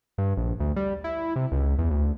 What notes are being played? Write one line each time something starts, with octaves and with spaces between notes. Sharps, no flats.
G2
A#1
D2
G3
E4
C3
C#2
E2
D2